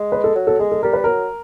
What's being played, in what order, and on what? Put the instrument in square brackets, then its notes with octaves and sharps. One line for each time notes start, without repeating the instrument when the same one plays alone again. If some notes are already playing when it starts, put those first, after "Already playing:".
Already playing: [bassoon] G#3
[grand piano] B4
A4
[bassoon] F#3
[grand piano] A4
[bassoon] G#3 [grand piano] G#4
[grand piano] A4
[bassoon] G3 [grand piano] A#4
[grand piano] B4
[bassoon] F#3 [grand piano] A#4